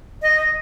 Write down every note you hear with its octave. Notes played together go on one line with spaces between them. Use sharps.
D#5